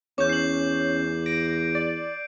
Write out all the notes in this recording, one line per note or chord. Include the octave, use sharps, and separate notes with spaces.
E2 C#4 D6 G6
C7 F#7
A#6 D7
D5